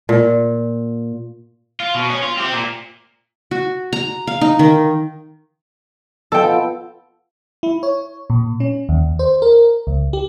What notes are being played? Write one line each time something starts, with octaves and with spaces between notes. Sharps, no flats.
A#2
F4
B2
C#4
F4
C4 G4
A#2
F#4
A#5
F5
D#4
D#3
B2 F3 A4 G5
E4
C#5
A#2
C#4
D#2
C5
A#4
C#2
G4